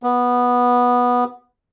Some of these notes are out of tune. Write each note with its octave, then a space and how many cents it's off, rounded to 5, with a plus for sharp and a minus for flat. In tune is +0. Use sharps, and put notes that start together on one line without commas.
B3 -10